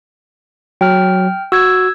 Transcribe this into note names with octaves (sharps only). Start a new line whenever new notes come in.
F#3 G5 F6
F#4 E6 G#6